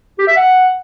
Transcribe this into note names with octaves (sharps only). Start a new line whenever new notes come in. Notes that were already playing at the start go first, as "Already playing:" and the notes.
G4
E5
F#5